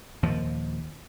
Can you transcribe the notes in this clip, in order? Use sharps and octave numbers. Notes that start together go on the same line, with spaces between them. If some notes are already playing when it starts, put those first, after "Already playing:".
D#2 A#2 F3